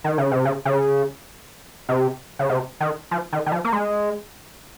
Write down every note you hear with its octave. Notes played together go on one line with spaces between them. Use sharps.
D#3
C#3
C3
C#3
C#3
C3
C#3
C3
D#3
F3
D#3
D#3
F3
A#3
G#3